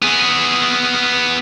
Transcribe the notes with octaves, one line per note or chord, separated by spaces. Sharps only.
B3 G#4